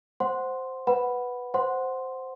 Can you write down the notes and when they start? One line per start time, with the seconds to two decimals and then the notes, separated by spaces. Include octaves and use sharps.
0.20 C5 F#5 C6
0.87 B4 F#5 B5
1.54 C5 F#5 C6